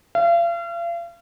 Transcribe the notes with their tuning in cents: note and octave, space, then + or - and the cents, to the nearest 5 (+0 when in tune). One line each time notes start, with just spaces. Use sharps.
F5 -40